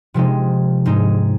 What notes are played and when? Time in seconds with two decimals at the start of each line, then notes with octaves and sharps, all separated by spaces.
0.14 C3 F3 G#3 D#4
0.86 G#2 G#3 D#4